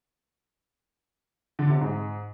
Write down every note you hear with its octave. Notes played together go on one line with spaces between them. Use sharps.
D3
C3
G#2